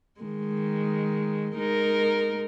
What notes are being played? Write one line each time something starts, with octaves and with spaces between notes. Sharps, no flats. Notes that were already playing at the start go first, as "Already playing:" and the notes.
D#3 G#3
G#3 D#4 A#4